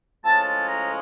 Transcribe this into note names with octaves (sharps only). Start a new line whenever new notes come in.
A2 F3 G#3 C#4 A5
A5
A#5